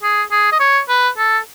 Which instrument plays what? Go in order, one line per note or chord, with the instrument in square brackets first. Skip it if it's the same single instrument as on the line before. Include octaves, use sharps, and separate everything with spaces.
[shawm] G#4
G#4
D#5
C#5
B4
A4